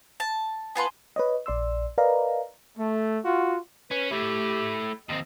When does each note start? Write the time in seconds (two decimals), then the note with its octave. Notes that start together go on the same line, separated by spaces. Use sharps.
0.20 A5
0.75 B3 F4 B4 G#5 A5 C6
1.16 B4 C#5 D#5
1.46 A#1 D5 C6 E6
1.98 A#4 B4 D5 D#5 F5 A#5
2.77 A3
3.24 F4 F#4
3.91 C#4 B4
4.11 A3 E4 G4
5.09 D#2 C4 D#5